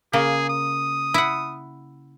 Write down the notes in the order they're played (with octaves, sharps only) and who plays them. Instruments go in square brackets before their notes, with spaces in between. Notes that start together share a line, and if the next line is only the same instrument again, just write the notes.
[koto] C#3 A#3 [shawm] G#4
[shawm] D#6
[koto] E4 F#5